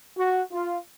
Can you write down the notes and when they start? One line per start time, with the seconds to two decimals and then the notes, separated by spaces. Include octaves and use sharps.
0.18 F#4
0.52 F4